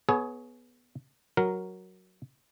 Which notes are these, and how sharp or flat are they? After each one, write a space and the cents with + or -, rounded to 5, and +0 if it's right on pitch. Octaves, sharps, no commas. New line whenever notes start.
B3 -5 G#4 +30 C#5 +0
F#3 +0 A#4 +0